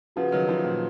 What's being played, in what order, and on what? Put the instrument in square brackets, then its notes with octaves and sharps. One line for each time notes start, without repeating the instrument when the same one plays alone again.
[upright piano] C#3 F3 [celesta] F#4 B4 F#5
[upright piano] D#3 F#3
C#3 F3
A#2